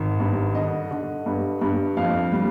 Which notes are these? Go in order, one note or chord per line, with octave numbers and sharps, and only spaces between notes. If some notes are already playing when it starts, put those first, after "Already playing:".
Already playing: G#1
G2
D3 D#5
D3
G2
G2
F2 F5
G3